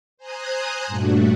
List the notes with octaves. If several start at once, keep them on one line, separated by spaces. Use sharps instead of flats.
C5 G#5 A#5 D#6 F#6 G#6
G2 A#2 A3 D4 F#4